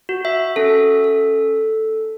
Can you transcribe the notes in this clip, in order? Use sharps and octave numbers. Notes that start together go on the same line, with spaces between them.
F#4
E5
C#4 A4
A4